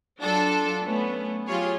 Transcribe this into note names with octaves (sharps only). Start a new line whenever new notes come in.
F#3 D4 F4 A4
A3 B3 C#4
F#3 F4 G4 G#4 C#5